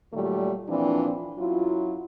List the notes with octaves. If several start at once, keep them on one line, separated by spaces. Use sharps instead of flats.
A#2 D#3 F#3 G3 A3
A#2 E3 F3 C4 D4
F#2 F#3 E4 F4